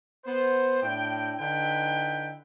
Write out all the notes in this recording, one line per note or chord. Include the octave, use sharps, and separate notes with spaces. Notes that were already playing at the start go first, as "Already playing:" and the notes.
B3 C5
A2 D4 G5
D3 D#4 E4 B4 G5